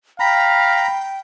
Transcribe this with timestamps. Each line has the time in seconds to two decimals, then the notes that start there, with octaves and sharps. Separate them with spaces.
0.20 F5 G5 A#5 B5